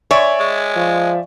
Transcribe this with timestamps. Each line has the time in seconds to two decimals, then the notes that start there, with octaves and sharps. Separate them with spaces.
0.11 C#5 D5 E5 G#5
0.40 G#3
0.76 F3